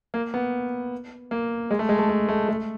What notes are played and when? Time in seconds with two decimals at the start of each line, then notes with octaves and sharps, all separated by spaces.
0.14 A#3
0.34 B3
1.31 A#3
1.71 G#3
1.79 A3
1.89 G#3
1.99 A3
2.09 A3
2.29 A3
2.48 A3